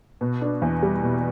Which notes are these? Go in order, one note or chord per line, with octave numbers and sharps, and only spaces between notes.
B2
D4
E2
G3
B2